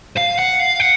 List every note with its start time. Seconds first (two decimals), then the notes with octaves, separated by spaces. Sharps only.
0.17 F5
0.38 F#5
0.59 F5
0.80 F#5